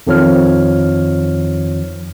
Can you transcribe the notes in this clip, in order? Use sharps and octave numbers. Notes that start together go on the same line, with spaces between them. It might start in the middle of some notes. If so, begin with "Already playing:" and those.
F2 D#3 F3 C#5 F6